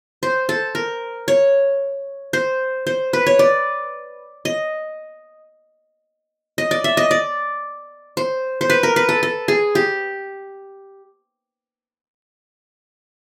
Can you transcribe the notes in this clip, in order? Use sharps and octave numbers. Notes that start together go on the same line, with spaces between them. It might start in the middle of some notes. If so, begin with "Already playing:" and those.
C5
A4
A#4
C#5
C5
C5
B4
C#5
D5
D#5
D#5
D5
E5
D#5
D5
C5
C5
B4
A#4
B4
A4
A4
G#4
G4